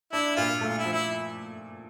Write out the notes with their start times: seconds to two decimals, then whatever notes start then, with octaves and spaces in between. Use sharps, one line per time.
0.12 D4 E4
0.37 A#2 F4
0.61 A3
0.69 F4
0.78 E4
0.85 F3
0.93 E4